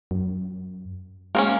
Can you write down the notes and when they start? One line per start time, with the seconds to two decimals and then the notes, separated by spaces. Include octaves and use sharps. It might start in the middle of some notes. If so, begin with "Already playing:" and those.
0.11 F#2
1.35 G#3 A#3 C4 C#4